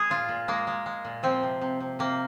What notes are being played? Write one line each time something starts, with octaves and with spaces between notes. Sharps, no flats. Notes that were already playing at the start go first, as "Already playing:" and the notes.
Already playing: G#3 G#4
A#2 F4
A#2
G#3 A#3
G#3
G#3
A#2
F3 C4
C3
C3
C3
C3 A#3